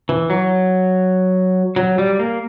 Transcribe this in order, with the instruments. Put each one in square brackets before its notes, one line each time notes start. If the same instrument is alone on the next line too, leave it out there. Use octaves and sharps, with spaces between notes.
[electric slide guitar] E3
F#3
F#3
G3
A#3